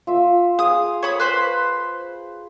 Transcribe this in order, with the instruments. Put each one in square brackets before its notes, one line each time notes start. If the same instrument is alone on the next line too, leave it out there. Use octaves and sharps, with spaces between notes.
[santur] F4 E5
[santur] G#4 F5 [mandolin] D#6
[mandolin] C#5 B5 D#6
B4 C5 B5